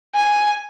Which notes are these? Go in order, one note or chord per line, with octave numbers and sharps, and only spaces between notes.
G#5